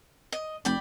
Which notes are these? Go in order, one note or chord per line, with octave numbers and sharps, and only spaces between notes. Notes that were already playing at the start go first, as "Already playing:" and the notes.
D#5
F1 D5 G5 B5